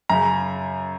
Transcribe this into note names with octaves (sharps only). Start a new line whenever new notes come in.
F#2 C#3 A#5